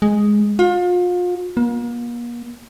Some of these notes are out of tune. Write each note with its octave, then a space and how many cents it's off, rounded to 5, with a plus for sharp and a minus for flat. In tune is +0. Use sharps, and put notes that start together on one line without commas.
G#3 +0
F4 +35
A#3 +40